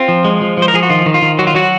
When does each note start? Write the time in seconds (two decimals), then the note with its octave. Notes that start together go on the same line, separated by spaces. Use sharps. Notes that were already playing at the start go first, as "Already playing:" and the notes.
Already playing: C4 F4
0.08 F3
0.25 G#3
0.41 F3
0.57 F3 C5
0.68 A#4
0.73 F3 G#4
0.83 F#4
0.89 D#3 F4
1.06 D#3
1.14 F4
1.22 D#3
1.39 F#3 F#4
1.47 F4
1.54 F#3 F#4